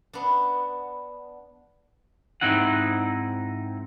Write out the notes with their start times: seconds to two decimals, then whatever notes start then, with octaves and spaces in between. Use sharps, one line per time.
0.13 B3 D4
2.41 G#2 C#3 C4 D#4 E4 F#5